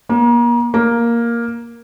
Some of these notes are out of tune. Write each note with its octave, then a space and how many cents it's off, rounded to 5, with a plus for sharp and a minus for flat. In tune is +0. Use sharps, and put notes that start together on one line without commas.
A#3 +35
A#3 +5